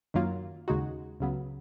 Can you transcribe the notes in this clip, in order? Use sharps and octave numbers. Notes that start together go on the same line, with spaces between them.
F#2 D#3 F#3 A#3 F4
D#2 C#3 G#3 D#4 F#4
C#2 C#3 F#3 B3